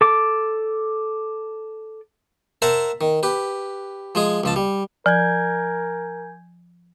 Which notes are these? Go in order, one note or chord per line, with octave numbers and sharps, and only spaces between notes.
A4 D6
A#4 C5 E5 F#5 A5 A#5
D#3
G4 B4
F3 G#3 G#4
C#2 F3 A5
G3
F3 A#4 G#5 G6 G#6